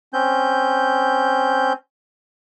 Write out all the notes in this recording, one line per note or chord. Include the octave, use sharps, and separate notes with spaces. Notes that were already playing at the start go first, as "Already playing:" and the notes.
C4 C#4 G6